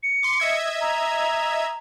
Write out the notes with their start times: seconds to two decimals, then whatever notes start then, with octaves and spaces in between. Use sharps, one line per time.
0.03 C#7
0.23 C6 D6
0.40 D#5 E5 G#6
0.81 A#5